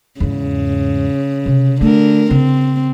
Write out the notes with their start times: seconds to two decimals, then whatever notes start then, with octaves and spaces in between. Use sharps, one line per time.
0.20 E2 G#2 C#3
1.46 C3
1.81 D3 A3 D4 A#4
2.31 C#3 C4